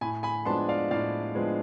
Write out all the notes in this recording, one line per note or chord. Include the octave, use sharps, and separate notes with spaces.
A2 G#5 B5
G#5 B5
F3 G#3 B3 D4 A5 C6
D5 F5
A2 D5 F5
F3 G#3 B3 D4